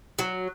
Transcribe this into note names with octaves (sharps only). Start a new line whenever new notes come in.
F#3